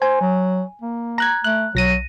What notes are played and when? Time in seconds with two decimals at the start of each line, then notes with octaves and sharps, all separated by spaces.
0.02 C5 G#5
0.21 F#3
0.82 A#3
1.18 A#5 F#6 G#6
1.44 A3 F#6
1.75 B1 F#3 A#6 D#7